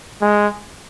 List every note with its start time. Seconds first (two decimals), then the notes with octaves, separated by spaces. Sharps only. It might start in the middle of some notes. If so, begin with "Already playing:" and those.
0.22 G#3